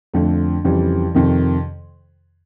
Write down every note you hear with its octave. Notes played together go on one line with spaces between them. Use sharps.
F2 D3 F3 A3
F2 C#3 E3 G3
F2 C3 D#3